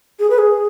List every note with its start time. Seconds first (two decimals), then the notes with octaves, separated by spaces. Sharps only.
0.20 G#4
0.30 B4
0.38 G#4